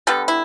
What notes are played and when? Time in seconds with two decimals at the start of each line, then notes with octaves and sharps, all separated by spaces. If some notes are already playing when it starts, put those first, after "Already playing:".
0.07 D3 G3 B3 A4
0.28 E4